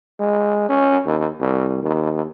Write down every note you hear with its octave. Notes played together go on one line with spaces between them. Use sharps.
G#3
C#4
D#2
C2
D#2